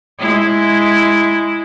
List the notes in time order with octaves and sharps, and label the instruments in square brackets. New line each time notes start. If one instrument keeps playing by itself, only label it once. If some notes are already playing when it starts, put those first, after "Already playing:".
[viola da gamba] G#3 E4